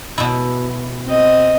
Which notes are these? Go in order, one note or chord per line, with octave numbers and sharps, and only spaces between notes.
B2 E4
C4 D#5